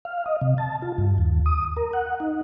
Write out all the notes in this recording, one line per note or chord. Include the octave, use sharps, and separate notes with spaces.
F5
D#5
C3
A5
F4
G2
D#2
D#6
A#4
F#5
D#4